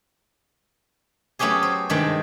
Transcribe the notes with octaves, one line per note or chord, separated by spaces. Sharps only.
F#3 A3 B3 C#4 G4 G#4
C5
G2 C3 D#3 G#3 A3 B5